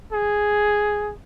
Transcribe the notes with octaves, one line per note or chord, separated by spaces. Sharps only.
G#4